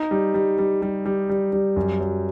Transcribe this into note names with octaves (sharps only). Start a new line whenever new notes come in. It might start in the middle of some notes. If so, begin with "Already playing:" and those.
Already playing: D#4
G3
G3
G3
G3
G3
G3
G3
F#2
F#3